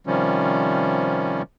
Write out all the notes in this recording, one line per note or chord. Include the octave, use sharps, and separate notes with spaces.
C3 D#3 F3 G3 C#4